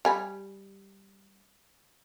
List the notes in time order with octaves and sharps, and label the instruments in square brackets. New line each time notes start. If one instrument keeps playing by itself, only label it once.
[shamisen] G3 G#5 B5